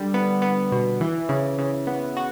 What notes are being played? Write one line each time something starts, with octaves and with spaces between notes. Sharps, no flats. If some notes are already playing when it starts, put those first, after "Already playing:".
Already playing: D3 G3
B3
B3
B2
E3
C#3
C#3
B3
F#4